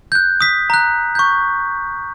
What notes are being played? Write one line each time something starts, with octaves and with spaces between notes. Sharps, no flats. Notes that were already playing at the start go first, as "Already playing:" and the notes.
F#6 G6
D#6 B6
A#5 F#6
C#6 G6